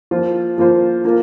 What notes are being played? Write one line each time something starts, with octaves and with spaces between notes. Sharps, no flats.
F3 A#3 F4 C5
F3 A#3 F4 C5
A#3 F4 A#4